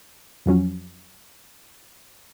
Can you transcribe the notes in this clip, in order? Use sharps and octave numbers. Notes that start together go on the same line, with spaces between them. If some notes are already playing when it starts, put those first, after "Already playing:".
F2 F3 F#3 C#4